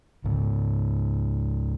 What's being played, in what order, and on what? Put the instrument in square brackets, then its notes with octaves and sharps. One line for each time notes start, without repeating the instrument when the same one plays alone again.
[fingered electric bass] C#2 G#2